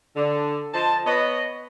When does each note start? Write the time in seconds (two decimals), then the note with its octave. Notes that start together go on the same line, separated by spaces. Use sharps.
0.16 D3
0.74 F3 C5 D#5 A5
1.06 B3 B4 C#5 D#5